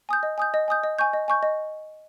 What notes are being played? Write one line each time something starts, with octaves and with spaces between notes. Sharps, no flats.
G#5 D#6 G6
D#5
G#5 D#6 G6
D#5
G#5 D#6 G6
D#5
G#5 C#6 G6
D#5
G#5 C#6 G6
D#5